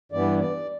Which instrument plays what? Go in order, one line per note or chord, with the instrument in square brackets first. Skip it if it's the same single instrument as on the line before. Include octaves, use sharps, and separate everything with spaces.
[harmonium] G2 E3 B3 D5
D5